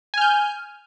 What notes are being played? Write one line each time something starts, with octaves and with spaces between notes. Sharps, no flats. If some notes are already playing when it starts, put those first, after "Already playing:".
G#5 F6 G6